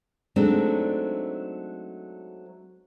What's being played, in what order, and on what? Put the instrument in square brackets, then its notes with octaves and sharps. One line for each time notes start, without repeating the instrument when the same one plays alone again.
[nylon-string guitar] F#3 G#3 A3 C4 D4 D#4